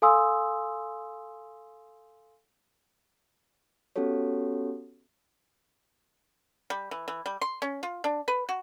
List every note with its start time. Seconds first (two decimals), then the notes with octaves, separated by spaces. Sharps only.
0.02 A4 F5 G#5 C6 D#6 E6
3.96 B3 C#4 F#4 G4 A4 C#5
6.70 G3
6.91 E3
7.08 E3
7.26 G3
7.41 C6
7.62 C#4
7.83 F4
8.04 D4
8.28 B4
8.49 F#4